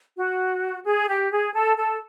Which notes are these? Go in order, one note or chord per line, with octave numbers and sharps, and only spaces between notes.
F#4
G#4
G4
G#4
A4
A4